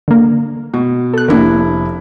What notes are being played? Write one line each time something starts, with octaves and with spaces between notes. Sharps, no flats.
D3 A#3
B2
A4 F#6
F1 A#3 D4 E4 A#4